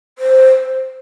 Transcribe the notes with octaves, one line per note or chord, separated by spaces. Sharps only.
C5